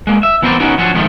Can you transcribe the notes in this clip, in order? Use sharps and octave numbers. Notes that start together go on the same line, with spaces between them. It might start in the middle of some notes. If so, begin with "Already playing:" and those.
G#3 A#3
E5
E3 B3 C4 A#4 C5 D5
B3 C#4 D#4 F#4 A#4
F3 F#3 C#4 D4
F2 G#2 D#3 F3 A3